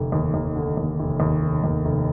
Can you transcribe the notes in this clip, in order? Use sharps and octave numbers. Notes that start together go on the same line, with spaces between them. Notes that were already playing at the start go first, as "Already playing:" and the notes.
Already playing: F1 D3
D#2
D#2
D3
D#2
F1
D#2
F1
D#2
F1